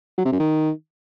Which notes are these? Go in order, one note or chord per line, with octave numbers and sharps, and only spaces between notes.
F#3
C3
F#2
D#3